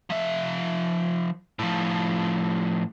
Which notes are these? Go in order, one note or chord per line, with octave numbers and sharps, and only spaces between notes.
F3 E5
A2 F3